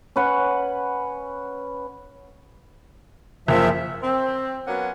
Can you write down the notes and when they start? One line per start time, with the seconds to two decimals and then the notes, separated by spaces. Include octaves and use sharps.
0.16 C#4 B4 F#5
3.48 F#1 F3 E5
4.03 C4
4.67 F#3 A#3 B3 C#4 F#5